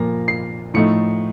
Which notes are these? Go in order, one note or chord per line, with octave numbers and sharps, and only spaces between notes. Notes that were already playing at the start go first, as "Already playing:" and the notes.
Already playing: A#2 F3 A#3 A#6
C7
A2 F3 A3 D#4 C#7